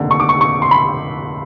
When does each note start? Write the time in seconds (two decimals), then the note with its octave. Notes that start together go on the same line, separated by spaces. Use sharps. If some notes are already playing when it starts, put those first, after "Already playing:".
Already playing: F1 D#2 D3
0.11 C#6
0.20 D6
0.29 C#6
0.41 C#6
0.62 C6
0.71 B5